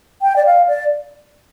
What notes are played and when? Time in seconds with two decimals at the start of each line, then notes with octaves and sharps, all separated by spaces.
0.22 G5
0.36 D5
0.46 F5
0.68 D5